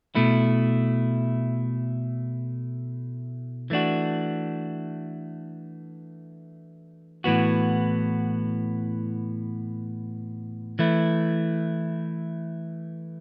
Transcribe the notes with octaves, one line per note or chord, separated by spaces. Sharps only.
B2 A3 E4
E3 A3 D4 F#4
A2 E3 B3 F#4
E3 A3 E4